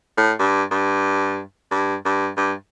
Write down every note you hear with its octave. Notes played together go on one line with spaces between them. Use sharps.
A2
G2
G2
G2
G2
G2